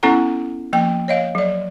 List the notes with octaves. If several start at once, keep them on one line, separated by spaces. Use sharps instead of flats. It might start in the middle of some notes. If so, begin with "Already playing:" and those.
B3 C#4 E4 A4 F#5 A#5
F3 A#3 G5
C#5 D#5 F5
F#3 D5